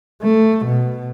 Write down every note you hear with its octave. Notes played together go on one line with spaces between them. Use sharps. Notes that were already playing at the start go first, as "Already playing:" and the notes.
A3
B2